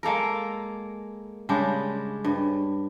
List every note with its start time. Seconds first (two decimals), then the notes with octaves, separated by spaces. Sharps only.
0.03 G#3 A#3 A4 A#4
1.49 C#3 G3 G#3 D4
2.24 G2